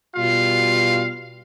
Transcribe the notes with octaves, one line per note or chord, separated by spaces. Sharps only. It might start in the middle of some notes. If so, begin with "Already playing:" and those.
B2 G3 F4 F5